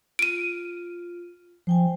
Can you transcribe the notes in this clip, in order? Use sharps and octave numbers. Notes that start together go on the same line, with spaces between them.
F4 D7 D#7
F3 C5 G5 G#5